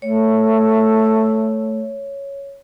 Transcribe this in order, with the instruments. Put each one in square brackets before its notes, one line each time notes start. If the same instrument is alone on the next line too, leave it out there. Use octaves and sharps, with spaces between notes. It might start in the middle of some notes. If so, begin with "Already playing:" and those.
[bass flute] A3 [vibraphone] C#5